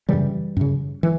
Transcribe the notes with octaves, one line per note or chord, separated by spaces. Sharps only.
F#2 C#3 E3 G3
F#2 C#3
E3